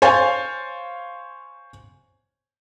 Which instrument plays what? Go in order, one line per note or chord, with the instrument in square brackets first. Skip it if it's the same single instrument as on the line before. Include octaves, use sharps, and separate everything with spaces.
[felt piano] C5 C#5 F5 G#5 A6